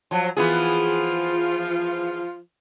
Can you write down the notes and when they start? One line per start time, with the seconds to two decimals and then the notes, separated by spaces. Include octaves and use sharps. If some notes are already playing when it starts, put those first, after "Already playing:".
0.11 F3 F#3
0.37 E3 F3 B3 F4 G#4